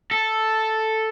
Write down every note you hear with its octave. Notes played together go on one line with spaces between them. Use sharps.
A4